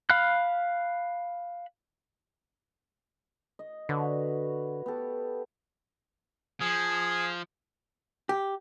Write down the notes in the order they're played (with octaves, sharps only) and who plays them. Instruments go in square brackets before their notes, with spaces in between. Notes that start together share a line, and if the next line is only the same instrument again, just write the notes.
[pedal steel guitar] F5 B5 F6 F#6
[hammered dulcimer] D#5
[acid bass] D3 [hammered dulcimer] F#4 B4 C#5
[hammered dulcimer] B3 G4 A4
[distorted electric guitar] F3 [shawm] G#4
[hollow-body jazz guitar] G4